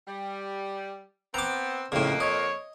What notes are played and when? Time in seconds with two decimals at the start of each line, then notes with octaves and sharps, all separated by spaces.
0.08 G3
1.34 B3 C4 A#5 D6
1.92 F2 A2 C#3 A#3
2.20 C#5 D#5